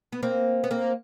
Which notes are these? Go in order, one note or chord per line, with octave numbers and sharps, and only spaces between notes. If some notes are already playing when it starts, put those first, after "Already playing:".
B3
A#3 C4
B3
A#3 C4